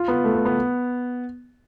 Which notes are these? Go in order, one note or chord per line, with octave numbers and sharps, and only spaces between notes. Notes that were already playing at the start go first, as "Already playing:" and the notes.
Already playing: F4
B3
A3
B3
B3